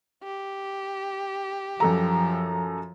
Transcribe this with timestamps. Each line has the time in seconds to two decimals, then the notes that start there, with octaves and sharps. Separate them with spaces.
0.24 G4
1.80 F#2 F3 A4 A#5